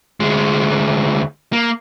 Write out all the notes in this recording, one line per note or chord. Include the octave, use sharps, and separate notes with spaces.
D2 G#3
A#3